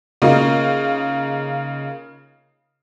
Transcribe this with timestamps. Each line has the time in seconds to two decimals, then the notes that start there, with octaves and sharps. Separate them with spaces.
0.22 C#3 A#3 D#4 F4